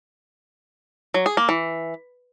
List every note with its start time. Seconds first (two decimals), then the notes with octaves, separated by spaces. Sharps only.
1.14 F#3
1.26 G#4
1.37 A#3
1.49 E3